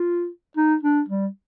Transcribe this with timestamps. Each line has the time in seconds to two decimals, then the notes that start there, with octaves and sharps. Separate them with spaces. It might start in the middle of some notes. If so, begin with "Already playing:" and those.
Already playing: F4
0.57 D#4
0.83 D4
1.09 G3